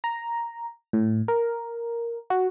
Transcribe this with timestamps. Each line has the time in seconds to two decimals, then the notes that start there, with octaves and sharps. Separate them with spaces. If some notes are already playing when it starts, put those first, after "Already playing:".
0.04 A#5
0.93 A2
1.28 A#4
2.30 F#4